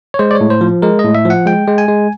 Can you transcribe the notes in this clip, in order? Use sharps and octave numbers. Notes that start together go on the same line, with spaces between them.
C#5
G#3 C5
D5
C#5
A2
C5
F3
G#3 A#4
A2 D#5
E5
F3
F#5
G#3 G5
G#3
G#5
G#3